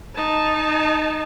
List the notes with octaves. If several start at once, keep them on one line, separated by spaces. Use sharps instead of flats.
D#4 A5